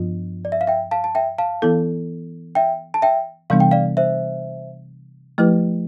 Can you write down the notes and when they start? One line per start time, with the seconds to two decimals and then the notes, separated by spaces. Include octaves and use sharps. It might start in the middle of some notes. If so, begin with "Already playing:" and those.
Already playing: G2 F3 B3 D4 F4
0.45 D5
0.52 E5
0.61 F5
0.67 E5 G5
0.91 F5 A5
1.04 A5
1.15 E5 G5
1.38 F5 A5
1.62 E3 B3 E4 A4
2.55 E5 G5
2.94 A5
3.02 E5 G5
3.50 C3 E3 G3 B3 D4 F5
3.60 G5
3.71 D5 F5
3.97 C5 E5
5.38 F3 A3 E4 G4 B4